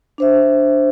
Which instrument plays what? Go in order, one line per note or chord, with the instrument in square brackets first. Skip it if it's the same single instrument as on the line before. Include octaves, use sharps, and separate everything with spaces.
[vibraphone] D4 C5 E5